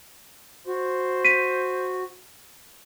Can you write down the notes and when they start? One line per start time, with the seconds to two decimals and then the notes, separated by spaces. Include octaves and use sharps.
0.67 F#4 C5
1.24 B6 D#7